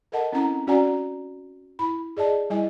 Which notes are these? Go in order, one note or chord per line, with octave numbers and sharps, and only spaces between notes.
A4 A#4 D#5 F#5 A5
C4 C#4 E4 F#5 A#5
C#4 F#4 D5 F#5 G#5 A#5
E4 B5
G#4 D5 D#5 A5
G3 E4 D#5 G#5